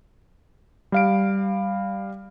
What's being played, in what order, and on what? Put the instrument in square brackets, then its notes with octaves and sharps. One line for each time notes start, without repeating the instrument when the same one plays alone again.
[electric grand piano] G3 F5 D7